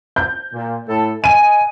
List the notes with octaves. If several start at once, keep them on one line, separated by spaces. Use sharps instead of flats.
G6
A#2
A2 A4
D#5 G#5 D#7